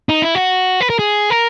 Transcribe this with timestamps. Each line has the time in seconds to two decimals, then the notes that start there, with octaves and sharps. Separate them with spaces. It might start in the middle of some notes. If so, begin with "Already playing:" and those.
0.09 D#4
0.22 E4
0.35 F#4
0.81 B4
0.90 A#4
0.99 G#4
1.30 A#4